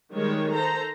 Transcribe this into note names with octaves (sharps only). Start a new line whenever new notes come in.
D#3 G3 G#3 C#5
A4 C5 A#5